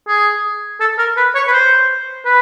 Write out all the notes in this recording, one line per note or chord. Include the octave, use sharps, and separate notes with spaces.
G#4
A4
A#4
B4
C#5
B4
C5
B4